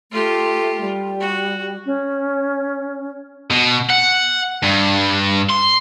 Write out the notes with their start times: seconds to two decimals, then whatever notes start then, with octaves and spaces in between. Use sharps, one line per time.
0.12 A3 F4 G4
0.81 G3
1.21 F#4
1.86 C#4
3.50 B2
3.90 F#5
4.63 G2
5.49 C6